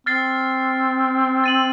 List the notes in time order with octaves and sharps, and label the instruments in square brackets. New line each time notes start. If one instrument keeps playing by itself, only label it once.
[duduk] C4 [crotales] F6 A6 C7
[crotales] A6 D#7 F#7